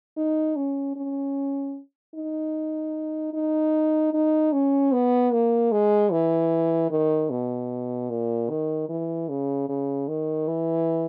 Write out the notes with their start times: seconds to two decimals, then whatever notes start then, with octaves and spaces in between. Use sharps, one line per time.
0.17 D#4
0.56 C#4
0.96 C#4
2.15 D#4
3.33 D#4
4.13 D#4
4.52 C#4
4.92 B3
5.32 A#3
5.72 G#3
6.11 E3
6.90 D#3
7.30 B2
8.10 A#2
8.50 D#3
8.89 E3
9.29 C#3
9.69 C#3
10.08 D#3
10.47 E3